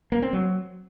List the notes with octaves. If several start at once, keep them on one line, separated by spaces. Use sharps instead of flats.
A#3
C4
F#3